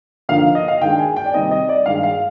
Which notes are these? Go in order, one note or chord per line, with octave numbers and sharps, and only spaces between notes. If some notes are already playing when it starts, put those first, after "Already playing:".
D3 F3 A#3 D#4 F5
D#5
F5
D#3 G#3 D4 G5
G#5
G5
D5
C3 D#3 G3 C4 D#4 D#5
D#5
D5
G2 D#3 G#3 F5
F5